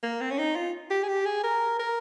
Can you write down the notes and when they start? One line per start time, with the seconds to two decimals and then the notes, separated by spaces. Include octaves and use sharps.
0.03 A#3
0.21 C4
0.31 C#4
0.38 D#4
0.55 F4
0.90 G4
1.03 G#4
1.08 G4
1.26 G#4
1.43 A#4
1.79 A#4